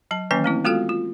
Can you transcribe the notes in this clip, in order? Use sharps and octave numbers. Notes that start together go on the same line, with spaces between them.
F#3 A5
D#3 E3 F#3 A#3 C#4 G#5
A3 C4 E4
G#3 B3 F4 F#4 A4 F5
F4